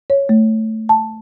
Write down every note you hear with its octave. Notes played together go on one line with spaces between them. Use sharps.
C#5
A3
A5